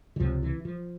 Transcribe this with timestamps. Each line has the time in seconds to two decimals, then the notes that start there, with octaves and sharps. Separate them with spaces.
0.16 E3
0.20 C#2 C3 F3
0.43 E3
0.65 F3